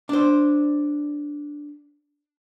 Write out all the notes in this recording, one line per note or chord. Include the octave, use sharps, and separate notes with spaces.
D4 C5